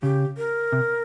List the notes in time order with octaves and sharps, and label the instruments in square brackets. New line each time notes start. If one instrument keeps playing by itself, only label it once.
[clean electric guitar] C#3 [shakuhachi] G4
[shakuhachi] A#4
[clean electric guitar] C3